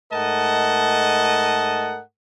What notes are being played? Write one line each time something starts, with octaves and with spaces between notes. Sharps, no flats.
G#2 A3 A#4 D#5 F#5 A5